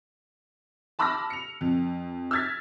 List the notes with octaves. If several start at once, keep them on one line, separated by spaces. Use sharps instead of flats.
A5 B5 D6 E6 F6 A#6
C#7 F7
F2
E6 F6 G#6 A6 B6